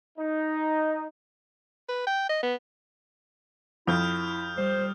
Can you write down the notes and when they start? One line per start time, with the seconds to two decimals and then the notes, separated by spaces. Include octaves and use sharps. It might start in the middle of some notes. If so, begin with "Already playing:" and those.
0.18 D#4
1.89 B4
2.07 G5
2.30 D#5
2.43 B3
3.87 F2 E4 D#6 F6 G6
4.57 G3 C5